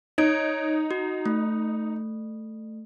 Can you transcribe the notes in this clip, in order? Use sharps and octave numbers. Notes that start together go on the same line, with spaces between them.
D#4 C#5 G#6 D7
F#4
A3